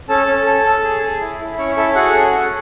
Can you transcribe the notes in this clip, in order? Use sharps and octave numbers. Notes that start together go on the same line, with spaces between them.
C#4 A4 A5
C#4
A4
A4
G#4
G#4
E4
E4
C#4 C#5
E4 A4 E5
F#4 G#4 F#5
C#4
A4